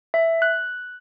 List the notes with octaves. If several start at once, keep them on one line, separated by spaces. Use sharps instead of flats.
E5
F#6